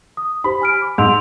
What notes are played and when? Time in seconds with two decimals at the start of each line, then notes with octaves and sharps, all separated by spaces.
0.17 D#6
0.44 D#4 G4 C5 B5
0.61 G#5 F6 D7
0.82 D6
0.98 G#2 C6 E6 F7